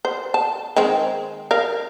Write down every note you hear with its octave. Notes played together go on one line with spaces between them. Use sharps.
C5
A5
D#3 G#3 C4
A#4 F5